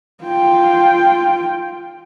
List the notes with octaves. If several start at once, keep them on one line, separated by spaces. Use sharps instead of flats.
F4 G5